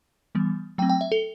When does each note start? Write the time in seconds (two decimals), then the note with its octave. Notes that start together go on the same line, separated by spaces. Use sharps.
0.35 E3 G3 B3
0.78 F#3 A3 C4 G5
0.89 G5
1.01 E5
1.12 A4